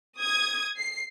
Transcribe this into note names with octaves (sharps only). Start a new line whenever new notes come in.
D#6 G#6
C7